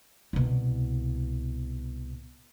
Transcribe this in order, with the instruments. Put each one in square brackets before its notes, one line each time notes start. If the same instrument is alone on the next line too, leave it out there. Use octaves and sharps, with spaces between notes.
[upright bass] C2 B2